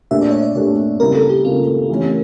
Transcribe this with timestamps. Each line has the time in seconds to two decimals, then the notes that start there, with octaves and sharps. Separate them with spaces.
0.11 A#2 A3 D4 G4 E5
0.21 D5
0.31 C#5
0.43 D5
0.55 A#2 A3 D4 G4 C#5
1.00 C#3 G3 A#3 E4 G4 A#4
1.15 A4
1.29 G4
1.45 C#3 G3 A#3 E4 F4 G4
1.89 E3 A3 C#4